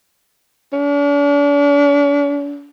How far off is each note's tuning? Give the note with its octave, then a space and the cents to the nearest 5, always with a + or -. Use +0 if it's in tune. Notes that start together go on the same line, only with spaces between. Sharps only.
D4 -45